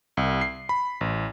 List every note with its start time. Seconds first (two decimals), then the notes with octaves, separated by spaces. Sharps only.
0.17 C2
0.41 C7
0.69 B5
1.01 A1